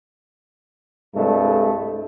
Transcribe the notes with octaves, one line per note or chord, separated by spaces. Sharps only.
C2 G2 G#3 A3